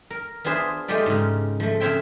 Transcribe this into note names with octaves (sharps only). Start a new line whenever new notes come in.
A#4
B3 D4 F4 G#4 C5 E5
G#3 A3 F4 G4 D5
G#2 C#3
F3 A3
C#3 C4 C#5 E5 G5